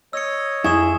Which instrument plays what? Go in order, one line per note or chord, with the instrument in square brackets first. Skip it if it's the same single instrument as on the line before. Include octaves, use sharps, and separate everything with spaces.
[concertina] C#5 D#5 [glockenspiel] E6 C#7
[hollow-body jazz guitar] F2 E4 [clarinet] G#4 [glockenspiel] G#5 C#6 E7